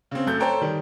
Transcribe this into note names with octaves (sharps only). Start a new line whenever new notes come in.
C#3 C4
F#2 A3 G6
A4 C5 C#5 G5 A#5
D#3 G3